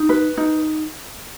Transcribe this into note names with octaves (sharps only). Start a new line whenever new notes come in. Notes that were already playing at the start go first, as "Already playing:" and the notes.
Already playing: D#4
B4
D#4